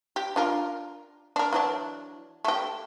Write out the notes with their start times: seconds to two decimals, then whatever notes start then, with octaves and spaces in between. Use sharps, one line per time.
0.16 G4
0.36 D4 F4 A#4
1.36 D4 A#4
1.53 E3 F#3 D4
2.45 A3 G4